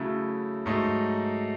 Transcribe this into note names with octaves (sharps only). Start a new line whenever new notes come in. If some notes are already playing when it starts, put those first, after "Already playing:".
Already playing: C#3 F#3 A3 E4
G#2 F#3 A3 D#4